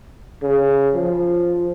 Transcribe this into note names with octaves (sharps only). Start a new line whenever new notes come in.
C#3
F3